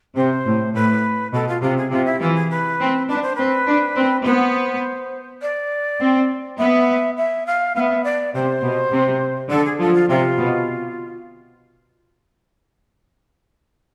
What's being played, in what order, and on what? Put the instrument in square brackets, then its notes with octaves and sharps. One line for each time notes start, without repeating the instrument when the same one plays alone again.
[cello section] C3 [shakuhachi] C5
[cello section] A2
[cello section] A2 [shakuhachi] B4
[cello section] B2 [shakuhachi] A4
[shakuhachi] F4
[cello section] C3 [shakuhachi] F4
[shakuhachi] G#4
[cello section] C3 [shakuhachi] F4
[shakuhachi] E4
[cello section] E3 [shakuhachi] F4
[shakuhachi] G#4
B4
[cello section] C4
[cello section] D4 [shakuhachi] B4
[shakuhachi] C5
[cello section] C4 [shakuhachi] B4
[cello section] D4
C4
[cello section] B3 [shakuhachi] C5
[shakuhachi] D5
[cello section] C4
[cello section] B3 [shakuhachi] E5
[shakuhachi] E5
F5
[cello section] B3 [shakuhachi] F5
[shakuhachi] E5
D5
[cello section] C3 [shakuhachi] C5
[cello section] B2
C3
[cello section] D3 [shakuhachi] A4
[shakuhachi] G#4
[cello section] F3 [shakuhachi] A4
[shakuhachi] F4
[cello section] C3 [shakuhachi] F4
[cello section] B2